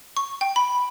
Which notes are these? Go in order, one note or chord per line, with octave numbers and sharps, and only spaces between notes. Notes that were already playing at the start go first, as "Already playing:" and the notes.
C#6
G5
B5